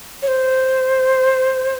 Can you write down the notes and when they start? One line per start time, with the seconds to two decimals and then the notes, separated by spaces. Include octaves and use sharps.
0.22 C#5
0.28 C5